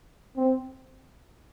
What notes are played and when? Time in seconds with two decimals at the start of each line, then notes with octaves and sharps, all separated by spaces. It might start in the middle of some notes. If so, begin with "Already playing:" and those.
0.37 C4